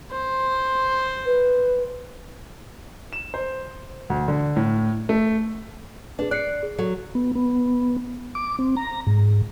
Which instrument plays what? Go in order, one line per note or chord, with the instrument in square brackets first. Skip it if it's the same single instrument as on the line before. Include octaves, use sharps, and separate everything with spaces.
[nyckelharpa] C5
[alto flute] B4
[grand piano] E7
C5
D2
D3
A2
A3
[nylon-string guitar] D4 [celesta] G#4 B4
[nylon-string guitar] D5 [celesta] F#6 C7 C#7
[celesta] G#4
[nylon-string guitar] F#3 [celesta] A4
[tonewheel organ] B3
B3
D6
C4
A#5
G#2